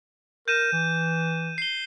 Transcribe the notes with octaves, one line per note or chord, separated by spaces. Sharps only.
A#4 G6 D#7 E7
E3
C7 G7